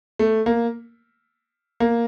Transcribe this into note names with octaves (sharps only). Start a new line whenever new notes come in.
A3
A#3
A#3